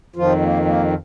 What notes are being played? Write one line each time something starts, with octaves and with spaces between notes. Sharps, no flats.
F2 D#3 F3 F4
A#3
A#3